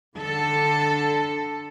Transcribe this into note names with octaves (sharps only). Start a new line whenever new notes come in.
D3 A4